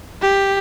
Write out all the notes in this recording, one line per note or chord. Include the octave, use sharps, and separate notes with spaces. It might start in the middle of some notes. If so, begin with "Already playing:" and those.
G4